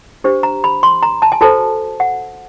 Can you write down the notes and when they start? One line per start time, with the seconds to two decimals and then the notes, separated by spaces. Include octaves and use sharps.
0.24 D4 G4 C5
0.43 A#5
0.64 B5
0.83 C6
1.03 A#5
1.22 A5
1.32 G#5
1.41 F#4 A4 C5 A5
2.00 F#5